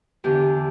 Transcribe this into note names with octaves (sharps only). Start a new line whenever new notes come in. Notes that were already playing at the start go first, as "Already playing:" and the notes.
E2 D3 G4